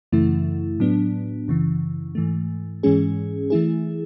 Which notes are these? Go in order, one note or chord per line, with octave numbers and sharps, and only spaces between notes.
F#2 C#3 E3 A3 E4
A2 F#3 B3 D4
F#2 C#3 E3
G#2 E3 A3
G#2 E3 G#3 C#4 G#4
E3 A3 E4 G#4